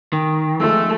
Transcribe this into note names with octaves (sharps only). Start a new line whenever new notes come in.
D#3 G5
F3 G#3 A3 E6